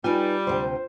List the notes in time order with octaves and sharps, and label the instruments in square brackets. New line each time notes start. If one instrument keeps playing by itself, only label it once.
[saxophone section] G3 [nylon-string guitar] D#4 B4 G#5 [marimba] F4
[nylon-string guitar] D2 C3 G5 [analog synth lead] C5